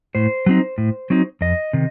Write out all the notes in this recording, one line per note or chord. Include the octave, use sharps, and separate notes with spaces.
A2 C5
F#3 C4 D#4
A2
F#3 C4 D#4
F2 D#5
C3 D#3